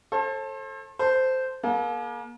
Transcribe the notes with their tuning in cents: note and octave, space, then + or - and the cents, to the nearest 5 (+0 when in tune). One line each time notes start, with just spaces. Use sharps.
A4 +0 C5 +40
A4 +0 C5 -10
A#3 +35 A4 -45